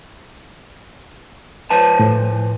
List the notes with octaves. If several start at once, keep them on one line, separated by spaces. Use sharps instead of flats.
F3 B4 A5
A2